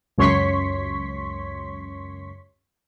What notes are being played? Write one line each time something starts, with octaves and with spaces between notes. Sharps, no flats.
C#2 F#2 C#5 C6 C#6 B6